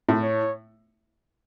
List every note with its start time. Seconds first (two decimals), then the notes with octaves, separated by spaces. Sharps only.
0.09 A2
0.22 C#5